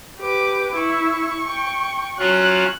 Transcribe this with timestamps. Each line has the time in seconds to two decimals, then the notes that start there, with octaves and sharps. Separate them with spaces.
0.20 G4 B4 D6
0.76 E4 C#6
1.45 G5
2.19 F#3 C#4 F4 F#6